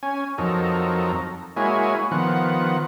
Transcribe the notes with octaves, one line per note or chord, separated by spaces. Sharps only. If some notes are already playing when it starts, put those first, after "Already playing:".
C#4 G#5
F2 F#3 D#4 A4 A#4
G#3 A#3 E4 F#4 C#5 G#5
D#3 F3 B3 F#5